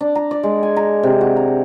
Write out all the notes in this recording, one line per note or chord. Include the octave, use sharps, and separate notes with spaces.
D4
A#5
D5
G#3
G#5
A#5
C3
F#4
A#5